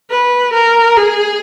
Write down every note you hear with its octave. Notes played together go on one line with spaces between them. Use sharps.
B4
A#4
G#4